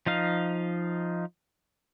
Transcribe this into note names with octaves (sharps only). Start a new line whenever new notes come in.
F3 D#4 F5